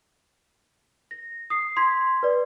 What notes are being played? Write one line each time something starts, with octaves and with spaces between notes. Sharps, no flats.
A#6
D#6 C7
C6 G#6 B6
B4 D5